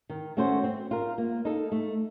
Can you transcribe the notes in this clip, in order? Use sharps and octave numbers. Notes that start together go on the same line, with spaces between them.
D#3
A3 C#4 F#4 C5
C4
F4 A#4
A#3
D#4 A4
A3